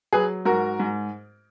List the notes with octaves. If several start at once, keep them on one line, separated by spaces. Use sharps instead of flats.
F#3 G#4 B4
G#2 F#4 A#4
G#2